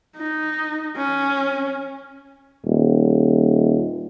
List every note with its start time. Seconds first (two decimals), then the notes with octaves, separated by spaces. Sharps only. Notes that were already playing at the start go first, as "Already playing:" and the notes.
0.17 D#4
0.97 C#4
2.66 D#1